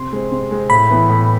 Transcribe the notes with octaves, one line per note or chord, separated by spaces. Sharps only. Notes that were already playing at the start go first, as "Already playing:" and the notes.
Already playing: C3 C6
G#3 C4
C3
G#3 C4
A2 B5
E3 B3 E4
A2